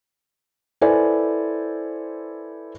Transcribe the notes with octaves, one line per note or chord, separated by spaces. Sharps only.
E4 A4 B4 C5 D5 G#5